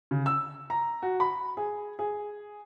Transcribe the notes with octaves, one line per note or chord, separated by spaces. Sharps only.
C#3
E6
A#5
F#4
B5
G#4
G#4